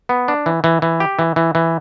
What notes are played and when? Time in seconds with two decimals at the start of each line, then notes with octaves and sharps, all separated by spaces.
0.09 B3
0.28 D4
0.46 E3
0.64 E3
0.82 E3
1.00 G4
1.19 E3
1.36 E3
1.55 E3